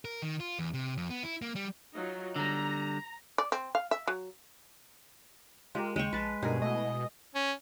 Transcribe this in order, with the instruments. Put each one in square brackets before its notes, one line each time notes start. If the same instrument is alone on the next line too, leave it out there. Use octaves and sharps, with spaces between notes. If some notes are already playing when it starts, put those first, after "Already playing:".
[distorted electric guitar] A#4
D#3
F4
E2
C3
F2
B3
E4
A#3
G3
[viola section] F#3 D#4 F4
[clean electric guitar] D3 G3 [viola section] A#5
[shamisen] D5
C4
F5
E5
F#3
[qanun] G#3 [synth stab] F4 G4 A#4
[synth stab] D#2 C#3 G5 [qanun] G#3 C#6
[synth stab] A#1 A5 [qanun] B4
[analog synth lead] G2 [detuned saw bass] B2 [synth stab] D#4 A#4 [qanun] G#4
[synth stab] A3 E4 [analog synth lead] D#5
[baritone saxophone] C#4